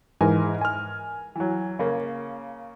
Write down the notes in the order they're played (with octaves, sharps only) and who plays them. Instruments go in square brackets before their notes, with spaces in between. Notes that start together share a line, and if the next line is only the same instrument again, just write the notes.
[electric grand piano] G#2 E3 G#5 [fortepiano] A#4
[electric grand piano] G#5 F6
[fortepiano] E3 F#3
C#3 A#3